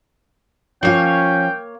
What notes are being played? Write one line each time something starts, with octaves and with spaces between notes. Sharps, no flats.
F3 A#3 C#4 F4 C#5 G5